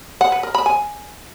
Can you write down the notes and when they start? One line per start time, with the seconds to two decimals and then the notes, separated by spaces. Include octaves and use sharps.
0.21 F#5
0.32 B4
0.43 A#4
0.55 B5
0.66 G#5